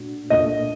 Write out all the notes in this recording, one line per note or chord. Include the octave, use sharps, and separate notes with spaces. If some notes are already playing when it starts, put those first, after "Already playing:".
Already playing: A#2 A3 D4 F#4
A#2 A3 D4 D#5